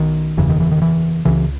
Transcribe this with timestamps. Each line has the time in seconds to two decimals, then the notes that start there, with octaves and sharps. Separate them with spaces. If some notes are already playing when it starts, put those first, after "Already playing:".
Already playing: B1 D#3
0.37 F#1 E2 C#3 E3
0.49 D#3
0.60 E3
0.72 D#3
0.82 E3
1.25 C#2 C#3 E3